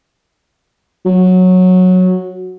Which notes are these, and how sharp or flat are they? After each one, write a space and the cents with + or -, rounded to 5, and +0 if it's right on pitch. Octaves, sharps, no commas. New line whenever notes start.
F#3 -10